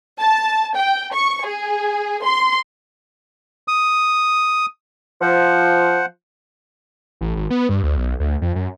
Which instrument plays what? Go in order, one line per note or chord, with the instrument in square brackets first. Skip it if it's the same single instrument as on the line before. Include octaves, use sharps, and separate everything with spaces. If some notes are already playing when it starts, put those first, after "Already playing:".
[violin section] A5
G5
C#6
G#4
C6
[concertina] D#6
[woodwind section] F3 [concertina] C5 F#5
[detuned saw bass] A1
G#1
B3
G2
D2
B1
D2
F2
F#2